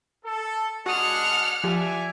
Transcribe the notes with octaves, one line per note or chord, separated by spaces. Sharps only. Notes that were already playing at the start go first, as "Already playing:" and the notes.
A4
G#3 D4 F#4 G#4 F#5 D#6 F6
F3 G4 D5 E5 G#5